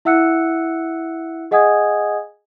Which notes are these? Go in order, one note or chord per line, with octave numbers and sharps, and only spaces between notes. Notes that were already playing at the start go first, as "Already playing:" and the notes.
E4 E5 F#5 E6 F#6 C#7
G#4 D#5 F#5 G#5 D#6 G#6